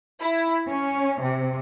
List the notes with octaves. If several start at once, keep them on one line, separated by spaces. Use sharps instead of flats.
E4
C#4
C3